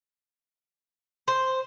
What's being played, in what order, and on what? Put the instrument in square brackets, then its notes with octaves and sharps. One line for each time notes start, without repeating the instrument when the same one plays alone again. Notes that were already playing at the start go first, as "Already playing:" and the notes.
[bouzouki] C5